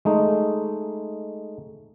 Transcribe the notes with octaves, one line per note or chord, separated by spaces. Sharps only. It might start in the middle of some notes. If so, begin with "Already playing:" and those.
G#3 A3 D#4